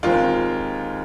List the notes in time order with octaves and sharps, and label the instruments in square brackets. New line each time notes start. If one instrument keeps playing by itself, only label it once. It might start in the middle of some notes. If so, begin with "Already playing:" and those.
[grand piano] D#2 D#3 G#3 C4 [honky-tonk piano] F4